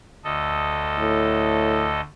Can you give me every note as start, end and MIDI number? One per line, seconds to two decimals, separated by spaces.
0.24 2.01 38
0.24 2.01 69
0.24 2.01 75
0.99 1.90 45